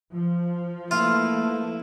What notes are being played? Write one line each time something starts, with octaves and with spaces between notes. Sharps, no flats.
F3
A3 A#3 E4 F4 B4 F5